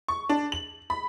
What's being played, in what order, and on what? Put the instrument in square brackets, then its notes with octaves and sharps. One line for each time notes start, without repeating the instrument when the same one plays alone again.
[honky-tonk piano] C#6
D4
F#7
B5